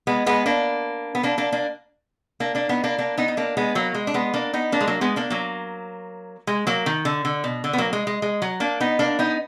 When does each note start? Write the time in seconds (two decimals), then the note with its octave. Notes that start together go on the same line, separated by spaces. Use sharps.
0.07 G#3 B3
0.26 G#3 B3
0.46 A#3 D4
1.15 B3
1.23 A#3 D4
1.38 A#3 D4
1.52 A#3 D4
2.40 A#3 D4
2.55 A#3 D4
2.69 B3 D#4
2.84 A#3 D4
2.98 A#3 D4
3.18 B3 D#4
3.28 D#4
3.37 A#3 D4
3.57 G#3 B3
3.75 F#3 A#3
3.95 G#3
4.07 D4
4.14 G#3 B3
4.34 A#3 D4
4.54 B3 D#4
4.72 A#3 D4
4.81 G#3
4.87 F#3 A#3
5.01 G#3 B3
5.16 A#3 D4
5.30 F#3 A#3
6.47 G#3
6.67 F#3 A#3
6.86 D#3
7.05 D3
7.25 D3
7.44 B2
7.64 D3
7.73 B3
7.78 F#3 A#3
7.93 G#3
8.07 G#3
8.22 G#3
8.42 F#3
8.60 A#3 D4
8.80 B3 D#4
8.99 A#3 D4
9.19 B3 D#4